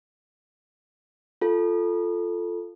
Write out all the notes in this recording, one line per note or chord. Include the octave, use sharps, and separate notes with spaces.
F4 A4